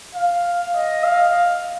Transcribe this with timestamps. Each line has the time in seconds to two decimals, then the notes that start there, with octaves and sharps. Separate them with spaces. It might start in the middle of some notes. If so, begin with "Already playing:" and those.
0.15 F5
0.75 D#5
1.04 F5